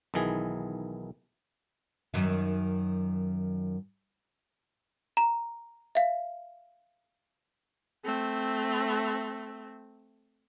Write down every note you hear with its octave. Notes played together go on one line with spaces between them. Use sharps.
B1 D#3 E3 G#4
F#2 D#3
A#5
E5 F5
A3 C4